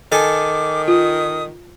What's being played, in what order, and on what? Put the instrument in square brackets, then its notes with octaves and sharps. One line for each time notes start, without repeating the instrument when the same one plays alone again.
[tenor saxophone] D#3 [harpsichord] A4 G#5 [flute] D6
[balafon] F4 [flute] D#6